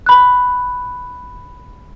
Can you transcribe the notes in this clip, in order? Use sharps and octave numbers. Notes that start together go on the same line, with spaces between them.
B5 F#6